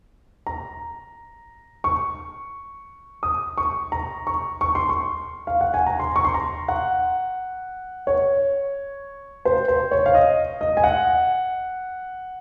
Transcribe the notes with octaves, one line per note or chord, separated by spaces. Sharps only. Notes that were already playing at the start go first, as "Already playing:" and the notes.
A#5
C#6
D#6
C#6
A#5
C#6
C#6
C6
C#6
F5
F#5
G#5
A#5
C6
C#6
C6
A#5
F#5
C#5
C5
C5
C#5
F5
D#5
D#5
G#5
F#5